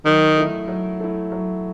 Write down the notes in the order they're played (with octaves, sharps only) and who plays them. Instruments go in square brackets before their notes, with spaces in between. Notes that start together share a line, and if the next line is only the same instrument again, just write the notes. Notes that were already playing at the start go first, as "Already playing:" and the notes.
[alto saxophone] D#3 [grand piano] F#3
[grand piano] A3 E4
F#3
A3 E4
F#3